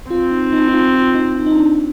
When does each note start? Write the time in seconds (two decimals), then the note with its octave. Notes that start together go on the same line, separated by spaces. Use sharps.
0.10 C4 F4
0.31 D#4
0.53 D#4
0.68 D#4
0.73 F4
0.94 F4
1.14 D#4
1.35 D#4
1.46 D#4
1.55 D4